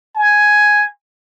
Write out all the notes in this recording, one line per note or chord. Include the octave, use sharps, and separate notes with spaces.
G#5